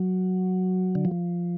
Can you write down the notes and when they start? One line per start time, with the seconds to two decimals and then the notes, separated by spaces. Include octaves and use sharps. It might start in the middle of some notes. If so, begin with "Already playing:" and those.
Already playing: F#3
0.95 D3
1.05 F3